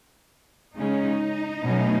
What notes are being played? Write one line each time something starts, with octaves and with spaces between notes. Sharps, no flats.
C#3 G#3 C#4 D#4
B2 F#3 A3 C#4